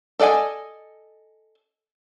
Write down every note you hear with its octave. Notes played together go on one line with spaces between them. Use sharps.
A4 D5 D#5 G5 G#5